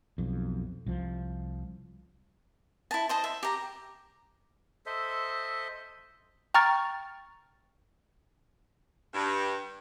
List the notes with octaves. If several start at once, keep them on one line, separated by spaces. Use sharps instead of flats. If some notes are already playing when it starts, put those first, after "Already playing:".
B1 F2
C2 F3
E4 A5
C5 D#5 A5
E5
G4 A#5
A4 C5 D#5 E5
G5 A#5 C#6 F6 A6
G2